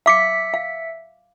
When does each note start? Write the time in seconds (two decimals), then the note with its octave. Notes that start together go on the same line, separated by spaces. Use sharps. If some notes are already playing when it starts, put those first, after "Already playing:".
0.06 E5 F5 D6 B6 C#7
0.54 F5